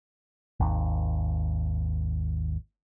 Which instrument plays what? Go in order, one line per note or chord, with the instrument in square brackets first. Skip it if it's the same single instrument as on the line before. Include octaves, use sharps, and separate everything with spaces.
[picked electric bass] G#1 D#2